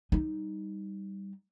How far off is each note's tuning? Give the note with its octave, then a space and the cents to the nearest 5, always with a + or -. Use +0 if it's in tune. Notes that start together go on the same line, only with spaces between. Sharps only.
G3 +0 D#4 +5